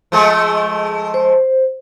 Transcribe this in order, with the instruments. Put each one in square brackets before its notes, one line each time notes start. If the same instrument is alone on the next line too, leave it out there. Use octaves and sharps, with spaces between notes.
[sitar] F3 G#3 A3
[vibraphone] C5